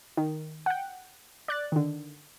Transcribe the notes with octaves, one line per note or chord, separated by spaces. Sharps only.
D#3
F#5 G5
D5 F#6 A6
D3 D#3